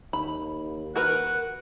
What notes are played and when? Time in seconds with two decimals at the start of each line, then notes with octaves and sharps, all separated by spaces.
0.13 D#2 B5
0.96 F#4 A#4 B4 F#5